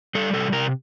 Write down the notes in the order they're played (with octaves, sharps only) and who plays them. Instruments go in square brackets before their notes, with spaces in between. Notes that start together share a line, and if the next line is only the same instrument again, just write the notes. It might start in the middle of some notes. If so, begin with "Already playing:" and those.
[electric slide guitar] G3 A4
C3 A4
C3 A#4